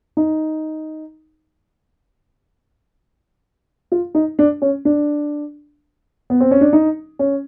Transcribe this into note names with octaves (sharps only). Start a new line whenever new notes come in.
D#4
F4
D#4
D4
C#4
D4
B3
C4
C#4
D4
D#4
C#4